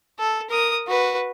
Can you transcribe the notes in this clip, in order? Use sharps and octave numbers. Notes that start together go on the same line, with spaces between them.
A4
A#4 D#6
F#4 B4